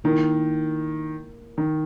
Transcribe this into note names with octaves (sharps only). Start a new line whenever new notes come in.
D#3 A#3 E4 A#4
D#3